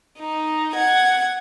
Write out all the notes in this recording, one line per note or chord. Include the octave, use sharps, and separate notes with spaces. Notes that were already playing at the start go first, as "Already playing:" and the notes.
D#4
F#5 G#6